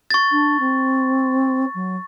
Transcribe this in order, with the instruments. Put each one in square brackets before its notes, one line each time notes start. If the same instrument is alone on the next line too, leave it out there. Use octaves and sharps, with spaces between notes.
[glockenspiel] C#6 A6
[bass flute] D4
C4
F#3